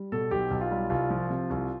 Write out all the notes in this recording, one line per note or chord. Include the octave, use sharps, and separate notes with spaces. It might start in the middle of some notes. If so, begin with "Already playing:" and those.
Already playing: G3
B2 A4
B1 G4
B1
F4
G3
C2 F4
F3
C3
C2